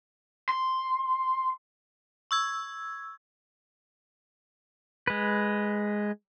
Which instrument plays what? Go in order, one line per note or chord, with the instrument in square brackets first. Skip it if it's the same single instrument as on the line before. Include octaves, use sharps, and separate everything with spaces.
[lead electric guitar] C6
[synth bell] C#6 E6 G#6
[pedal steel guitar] G#3 B4